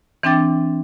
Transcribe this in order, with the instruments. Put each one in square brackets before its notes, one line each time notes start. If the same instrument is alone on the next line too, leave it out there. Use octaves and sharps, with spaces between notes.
[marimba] E3 C4 D4 G5 D6 A6